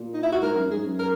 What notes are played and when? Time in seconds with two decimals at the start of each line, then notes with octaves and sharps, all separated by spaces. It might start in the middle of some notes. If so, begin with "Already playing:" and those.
Already playing: A#2
0.14 D#4
0.23 E4
0.32 F#4
0.41 G#2 A#4
0.56 F#2
0.66 F#2
0.70 G#2 G#4
0.85 F#2
0.99 A#4